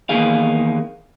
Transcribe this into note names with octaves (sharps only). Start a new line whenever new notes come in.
E2 D#3 A#3 G#4 F5